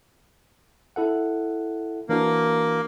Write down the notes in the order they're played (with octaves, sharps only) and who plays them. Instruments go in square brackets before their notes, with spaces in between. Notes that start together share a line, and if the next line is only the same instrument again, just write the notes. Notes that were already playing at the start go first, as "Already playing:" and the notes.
[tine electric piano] E4 A4 F#5
[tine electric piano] E3 D4 F#4 [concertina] A#3